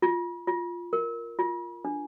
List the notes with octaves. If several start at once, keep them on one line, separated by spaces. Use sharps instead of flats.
F4
F4
A#4
F4
D4